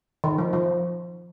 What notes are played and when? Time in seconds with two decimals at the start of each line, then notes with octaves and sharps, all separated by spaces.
0.24 D#3
0.38 F3
0.53 F3